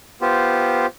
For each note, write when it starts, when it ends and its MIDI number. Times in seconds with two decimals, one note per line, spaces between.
0.22 0.86 59
0.22 0.86 65
0.22 0.86 67
0.22 0.86 72